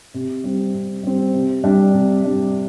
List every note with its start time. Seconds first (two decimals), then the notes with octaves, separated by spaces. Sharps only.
0.14 C3
0.44 G3 C4
0.74 C3
1.03 G3 C4
1.34 C3
1.64 G3 D4
1.94 C3
2.24 G3 D4